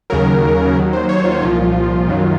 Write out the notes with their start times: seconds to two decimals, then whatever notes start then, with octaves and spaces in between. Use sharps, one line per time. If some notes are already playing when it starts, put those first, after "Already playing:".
0.10 D#2 C#3 F#3 A#4
0.76 D#2 D#3 F#3
0.93 C5
1.09 C#5
1.25 F4
1.42 C2 A#2 F3 F4
2.08 F#2 D#3 F#3